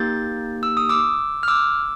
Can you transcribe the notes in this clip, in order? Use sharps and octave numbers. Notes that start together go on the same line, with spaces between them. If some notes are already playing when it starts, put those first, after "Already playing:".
Already playing: A#3 D#4 G4 G6 A6
E6
D#6
D6 E6
F6
D6 E6